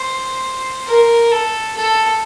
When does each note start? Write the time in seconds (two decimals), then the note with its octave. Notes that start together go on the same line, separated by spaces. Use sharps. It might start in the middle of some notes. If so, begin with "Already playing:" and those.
Already playing: C5
0.87 A#4
1.32 A4
1.77 A4